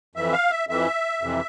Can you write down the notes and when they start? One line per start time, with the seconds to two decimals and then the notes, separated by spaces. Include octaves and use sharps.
0.15 F2 E3 E5
0.33 F5
0.51 E5
0.68 F2 E3 E5
1.22 F2 C3 E3